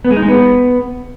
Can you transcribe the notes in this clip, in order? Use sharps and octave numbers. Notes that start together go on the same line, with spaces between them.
B3
G#3
D#4
G#3
B3